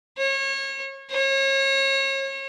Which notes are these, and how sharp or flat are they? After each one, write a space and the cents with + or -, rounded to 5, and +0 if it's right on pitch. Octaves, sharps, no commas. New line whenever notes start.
C#5 -30
C#5 -35